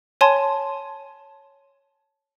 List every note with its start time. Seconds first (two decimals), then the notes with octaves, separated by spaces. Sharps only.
0.21 C#5 G#5 A5 C6